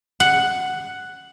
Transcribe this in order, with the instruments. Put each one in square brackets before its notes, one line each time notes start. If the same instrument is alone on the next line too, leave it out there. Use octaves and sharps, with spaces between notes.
[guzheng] F#5